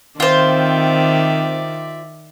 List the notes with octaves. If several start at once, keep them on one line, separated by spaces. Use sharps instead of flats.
D#3 C4 F4 C5 D5 E5